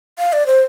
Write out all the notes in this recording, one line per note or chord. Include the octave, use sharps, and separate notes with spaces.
F5
D5
C5